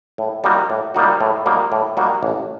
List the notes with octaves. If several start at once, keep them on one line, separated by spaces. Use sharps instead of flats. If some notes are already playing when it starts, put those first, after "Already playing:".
A2
G3 A#3 D#4 F#4
A2
G3 A#3 D#4 F#4
A2
G3 A#3 D#4 F#4
A2
G3 A#3 D#4 F#4
A1